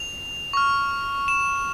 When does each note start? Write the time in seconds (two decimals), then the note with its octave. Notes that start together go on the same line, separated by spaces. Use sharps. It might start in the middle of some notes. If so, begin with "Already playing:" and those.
Already playing: F7
0.53 C#6 F6
1.28 E7